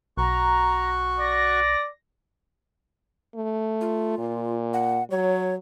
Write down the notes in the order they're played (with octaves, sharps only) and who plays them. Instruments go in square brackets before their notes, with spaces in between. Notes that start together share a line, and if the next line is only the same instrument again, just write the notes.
[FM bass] B1 [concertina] F#4 C#6 F#6 [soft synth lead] A#5
[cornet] D5 [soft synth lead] A#6
[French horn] A3
[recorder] F4
[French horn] A#2
[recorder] F#5
[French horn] F#3 [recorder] C#5